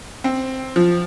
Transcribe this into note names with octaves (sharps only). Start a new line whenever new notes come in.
C4
F3